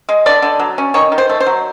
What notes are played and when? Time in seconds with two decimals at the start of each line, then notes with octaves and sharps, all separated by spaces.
0.09 G#3
0.26 D3 D5
0.42 D3
0.59 F#3
0.78 C#4
0.94 D#3 C#5
1.12 D#3
1.18 C5
1.29 A3
1.40 C5
1.46 F#3